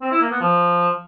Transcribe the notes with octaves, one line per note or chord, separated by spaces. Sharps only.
C4
E4
A#3
B3
F3